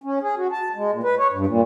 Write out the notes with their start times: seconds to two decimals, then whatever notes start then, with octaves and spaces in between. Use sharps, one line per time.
0.04 C#4
0.22 G#4
0.37 F#4
0.52 A5
0.75 G#3
0.92 A#2
1.03 B4
1.19 C#5
1.33 G2
1.47 A#2